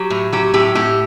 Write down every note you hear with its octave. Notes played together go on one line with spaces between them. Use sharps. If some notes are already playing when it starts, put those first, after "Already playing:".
Already playing: F#3 G4
A2
F#3 G4
A2 G4
A2 G4